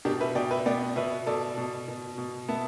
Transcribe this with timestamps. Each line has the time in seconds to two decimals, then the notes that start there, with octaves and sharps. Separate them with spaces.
0.05 B2 D4 G4
0.20 B4 E5
0.35 B2 D5 G5
0.51 B4 E5
0.66 B3 D5 G5
0.96 B2 B4 E5
1.26 B2 A4 D5
1.58 B2
1.88 B2
2.18 B2
2.48 B3 E5 A5